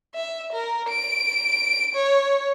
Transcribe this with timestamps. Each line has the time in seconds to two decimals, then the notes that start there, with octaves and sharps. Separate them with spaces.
0.14 E5
0.52 A#4
0.89 D7
1.94 C#5